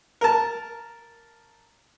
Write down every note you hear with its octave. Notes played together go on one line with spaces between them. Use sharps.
A#4 A5